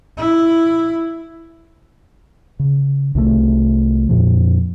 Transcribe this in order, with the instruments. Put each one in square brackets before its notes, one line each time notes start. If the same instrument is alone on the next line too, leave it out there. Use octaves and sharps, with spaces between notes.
[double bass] E4
[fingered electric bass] C#3
C2 C3 D#3 A3
F2 A#2 F3